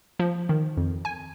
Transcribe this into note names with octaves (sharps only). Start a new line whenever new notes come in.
F3
D#3
F2
G#5